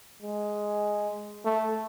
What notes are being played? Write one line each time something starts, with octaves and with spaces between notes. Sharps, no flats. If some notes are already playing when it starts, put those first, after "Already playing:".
G#3
A3